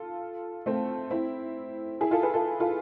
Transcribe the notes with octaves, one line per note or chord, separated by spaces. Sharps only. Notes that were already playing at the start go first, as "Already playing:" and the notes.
Already playing: F4 A4
A3 C4
C4 E4
E4 G#4
F4 A4
G#4 B4
F4 A4
F4 A4